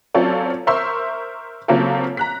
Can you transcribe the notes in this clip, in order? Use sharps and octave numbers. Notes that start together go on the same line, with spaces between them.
F#3 C4 C#4 F4 A4 D5
A#4 C5 E5 C6 C#6 E6
C#3 F#3 A#3 C4 F4 A4
A#5 F#6 B6